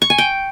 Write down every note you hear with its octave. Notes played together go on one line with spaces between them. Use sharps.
C#6
G#5
G5